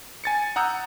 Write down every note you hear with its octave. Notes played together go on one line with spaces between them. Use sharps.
G#5 A6 C#7
F#5 A#5 D#6 E6 G6